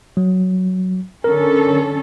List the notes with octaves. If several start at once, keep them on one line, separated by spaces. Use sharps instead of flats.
F#3
D3 C#4 A4 A#4